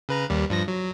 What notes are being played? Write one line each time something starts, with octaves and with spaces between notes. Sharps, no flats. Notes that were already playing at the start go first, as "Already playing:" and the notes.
C#3 B4 A#5
D#2 G3
G2 F3 A#6
F#3